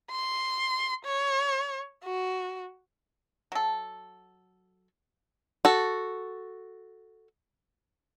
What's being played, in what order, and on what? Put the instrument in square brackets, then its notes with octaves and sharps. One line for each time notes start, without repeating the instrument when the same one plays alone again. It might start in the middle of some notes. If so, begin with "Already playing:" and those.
[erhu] C6
C#5
F#4
[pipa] F#3 A4
[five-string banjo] F#4 A4